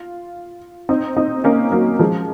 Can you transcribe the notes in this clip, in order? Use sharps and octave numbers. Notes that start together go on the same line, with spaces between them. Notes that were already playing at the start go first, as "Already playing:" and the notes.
Already playing: F4
C4 D#4
C4 D#4
A#3 C#4
F#3 A#3
F3 G#3